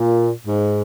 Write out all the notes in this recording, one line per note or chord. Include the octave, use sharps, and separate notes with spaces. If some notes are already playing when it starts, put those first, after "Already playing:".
Already playing: A#2
G#2